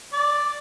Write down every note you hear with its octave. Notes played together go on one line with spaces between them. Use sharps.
D5